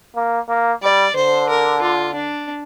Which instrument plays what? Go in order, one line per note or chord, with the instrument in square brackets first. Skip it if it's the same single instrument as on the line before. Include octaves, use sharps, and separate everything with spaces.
[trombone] A#3
A#3
[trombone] G3 [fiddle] D5
[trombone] D3 [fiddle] C5
[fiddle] A#4
F4
D4